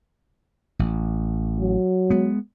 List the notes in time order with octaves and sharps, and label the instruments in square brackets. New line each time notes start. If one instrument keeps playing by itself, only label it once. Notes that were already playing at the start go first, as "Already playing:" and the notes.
[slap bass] A1
[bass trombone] F#3
[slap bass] G#3 B3